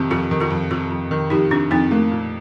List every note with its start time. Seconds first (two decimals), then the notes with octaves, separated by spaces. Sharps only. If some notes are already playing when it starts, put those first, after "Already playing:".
Already playing: F2 C3 D#3
0.10 F2 F4 A4
0.31 D#3
0.40 F4 A4
0.50 F2
0.71 C3 F4 A4
0.90 F2
1.11 D#3
1.30 F2 D#4 G4
1.51 C3 D4 F4
1.71 F2 C4 D#4
1.91 A3 A#3
2.11 A#2